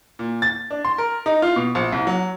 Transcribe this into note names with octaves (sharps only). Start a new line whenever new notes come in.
A#2
A6
D4
C6
A#4
D#4
F4
B2
A#1
C2
F#3